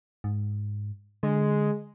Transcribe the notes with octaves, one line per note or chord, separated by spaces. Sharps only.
G#2
D3 G#3